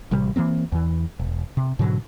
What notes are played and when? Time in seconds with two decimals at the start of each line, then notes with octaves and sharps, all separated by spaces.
0.11 A1 C3 G3
0.36 E3 F3 A#3 C4
0.72 E2 E3
1.19 E1
1.57 C3
1.79 G#2 B2 D3 F#3